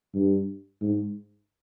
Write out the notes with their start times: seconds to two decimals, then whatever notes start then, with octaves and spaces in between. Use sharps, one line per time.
0.14 G2
0.81 G#2